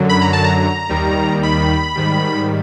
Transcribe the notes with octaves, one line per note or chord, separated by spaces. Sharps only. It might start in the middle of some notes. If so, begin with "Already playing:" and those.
Already playing: F#2 D3 F#3
B5
A#5
A5
A#5
D#2 D#3 G3
B5
G#2 D#3 G3